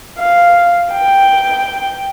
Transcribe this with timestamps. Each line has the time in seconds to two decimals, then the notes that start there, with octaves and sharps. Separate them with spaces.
0.19 F5
0.92 G5